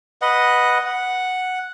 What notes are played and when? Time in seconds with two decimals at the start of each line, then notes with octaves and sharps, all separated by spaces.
0.22 B4 D#5 F#5
0.86 F#5